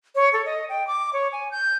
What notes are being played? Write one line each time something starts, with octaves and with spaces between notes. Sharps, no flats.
C#5
A4
D#5
G5
D6
C#5
G#5
G6